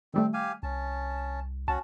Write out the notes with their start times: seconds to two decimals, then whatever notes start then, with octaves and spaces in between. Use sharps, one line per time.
0.14 D#3 G3 A3 C4
0.34 G4 F5 G#5
0.63 C2 C#4 A5
1.68 C2 C#4 F#4 A5